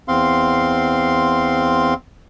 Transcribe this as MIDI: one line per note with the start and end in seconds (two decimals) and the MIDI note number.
0.08 1.94 40
0.08 1.94 60
0.08 1.94 77
0.08 1.94 84